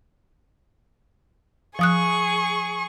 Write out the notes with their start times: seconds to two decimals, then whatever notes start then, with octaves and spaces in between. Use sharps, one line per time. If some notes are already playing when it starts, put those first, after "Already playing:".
1.79 F3 G#4 C#6 D#6 F#6